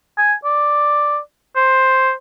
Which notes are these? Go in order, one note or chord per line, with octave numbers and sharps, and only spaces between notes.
G#5
D5
C5